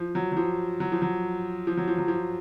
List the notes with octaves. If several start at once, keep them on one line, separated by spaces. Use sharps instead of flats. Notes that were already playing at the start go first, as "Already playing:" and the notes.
Already playing: F3
F#3
F#3
F3
F#3
F3
F#3
F3
F#3
F3
F#3
F3